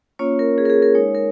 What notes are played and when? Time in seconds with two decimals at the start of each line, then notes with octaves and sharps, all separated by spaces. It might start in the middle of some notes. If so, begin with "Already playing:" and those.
0.19 A#3 C#4 F4 C#5
0.39 A#4
0.58 G#4
0.65 A#4
0.70 G#4
0.82 A#4
0.95 G#3 D#4 C#5
1.15 A#4